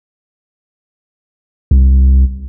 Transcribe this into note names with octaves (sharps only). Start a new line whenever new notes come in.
C2